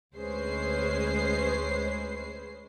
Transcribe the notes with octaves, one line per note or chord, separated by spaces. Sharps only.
D2 G#3 C#4 B4 C5 C7